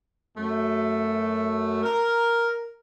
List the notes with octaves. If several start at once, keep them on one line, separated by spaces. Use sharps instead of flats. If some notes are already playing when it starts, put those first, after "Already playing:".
F#2 A3
A#4